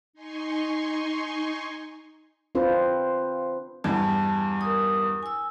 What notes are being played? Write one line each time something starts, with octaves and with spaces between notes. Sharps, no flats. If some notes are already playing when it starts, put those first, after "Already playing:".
D#4 G#5 C6 C#6
C4 D4 F4 B4 C5
E2 G2 A5
A#4 D#6
G#5 E6